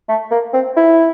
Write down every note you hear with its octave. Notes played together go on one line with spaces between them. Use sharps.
A3
A#3
C4
E4